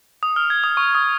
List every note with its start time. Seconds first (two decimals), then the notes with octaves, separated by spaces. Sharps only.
0.23 D#6
0.36 F6
0.50 G#6
0.64 D#6
0.77 C#6
0.95 D#6